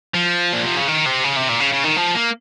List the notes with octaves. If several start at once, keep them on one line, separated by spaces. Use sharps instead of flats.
F3
A#2
C3
C#3
D#3
C3
C#3
C3
A#2
C#3
C#3
D#3
F3
A#3